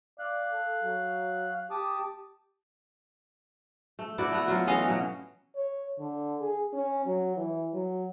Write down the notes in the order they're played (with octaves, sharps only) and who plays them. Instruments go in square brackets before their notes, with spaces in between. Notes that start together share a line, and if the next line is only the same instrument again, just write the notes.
[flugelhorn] D5 [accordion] F5 F#6
[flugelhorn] A4
F#3
[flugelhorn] G4 [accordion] A5 D6 D#6
[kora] A3
E4 F#4 D5
A3 B3
F#3 F4
E3 C#4 D#5 F5
B2 F#3
[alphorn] C#5
D3
G#4
C#4
F#3
E3
F#3